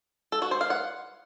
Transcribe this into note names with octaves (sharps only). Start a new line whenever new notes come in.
A4
F#4
C5
F5
F#5